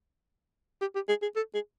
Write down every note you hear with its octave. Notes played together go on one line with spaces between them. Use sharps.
G4
G4
G#4
G#4
A4
G#4